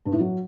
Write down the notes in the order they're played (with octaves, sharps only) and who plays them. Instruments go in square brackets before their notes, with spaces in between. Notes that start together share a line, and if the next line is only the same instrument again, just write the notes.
[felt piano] G2
A2
F#3